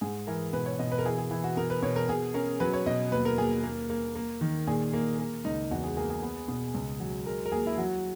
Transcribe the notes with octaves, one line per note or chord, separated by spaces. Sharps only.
G#2 G#4
E3 A#4
B2 B4
C#5
B2 D#5
B4
A#4
E3 G#4
G#4
E3 E4
F#4
B2 A#4
B4
B2 C#5
A#4
B2 G#4
C#4 A#4
F#3 B4
C#5
B2 D#5
D#2 B4
A#4
D#2 G#4
A#3
A#3
A#3
D#3
A#2 G#4
A#3
A#3
C#2 D#4
E2 F#4
G#4
A#3 G#4
G#4
B3
B2
C#2
F#3
G#3 A#4
A#4
D#2 G#4
E4
F#3 F#4